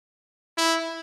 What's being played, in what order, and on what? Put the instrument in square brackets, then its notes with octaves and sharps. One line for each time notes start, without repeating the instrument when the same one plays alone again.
[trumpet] E4